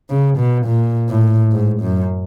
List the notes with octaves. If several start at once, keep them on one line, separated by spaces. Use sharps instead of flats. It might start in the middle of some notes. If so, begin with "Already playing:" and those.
C#3
B2
A#2
A2
G#2
F#2